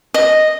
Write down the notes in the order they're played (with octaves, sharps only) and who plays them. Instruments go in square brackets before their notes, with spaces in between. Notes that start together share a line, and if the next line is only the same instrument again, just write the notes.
[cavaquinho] D#5